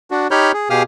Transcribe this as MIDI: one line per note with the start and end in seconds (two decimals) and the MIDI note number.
0.11 0.28 62
0.11 0.28 66
0.31 0.52 63
0.31 0.52 67
0.31 0.52 73
0.31 0.52 83
0.31 0.52 89
0.31 0.52 91
0.53 0.70 68
0.70 0.83 47
0.70 0.83 67
0.70 0.83 68
0.70 0.83 77
0.70 0.83 87
0.70 0.83 89